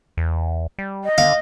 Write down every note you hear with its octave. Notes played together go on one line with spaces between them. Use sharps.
E2
G3
D#5
D3 F5